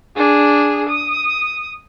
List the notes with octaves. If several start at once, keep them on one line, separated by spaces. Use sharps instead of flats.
D4 G#4
D#6